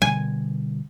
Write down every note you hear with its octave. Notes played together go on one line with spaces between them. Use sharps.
B2 D3 G3 G#5